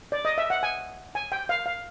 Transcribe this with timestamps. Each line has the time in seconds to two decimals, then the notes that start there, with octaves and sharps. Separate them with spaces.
0.12 D5
0.25 D#5
0.38 E5
0.50 F#5
0.63 G#5
1.15 G#5
1.32 G5
1.49 F5
1.66 F5